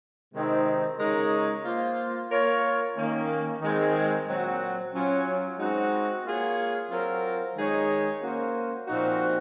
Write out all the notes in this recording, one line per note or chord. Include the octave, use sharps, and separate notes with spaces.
C3 D#3 G#3 C4 D#4
C#3 G#3 D#4 A#4 C#5
A#3 F4 C5
A#3 F4 A#4 C#5
D#3 A#3 C#4
D#3 G#3 C4
A#2 F#3 C4 F#4
F#3 C#4 F4
G#3 C4 D#4 F#4
A#3 F4 G#4 C#5
F#3 C4 F4 A#4
D#3 G#3 D#4 G#4 C#5
A#3 C#4 F#4 C5
A#2 F3 C4 D#4 F#4